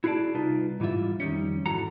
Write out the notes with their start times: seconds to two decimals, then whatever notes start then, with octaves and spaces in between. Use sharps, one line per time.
0.04 E4 F#4 G#4 C#5 D5 A5
0.35 C2 D#4 F4 B4
0.80 G#2 E3 G3 F4 E5
1.20 F2 D#3 G3 C#4
1.66 G#2 E3 F#4 A4 A#5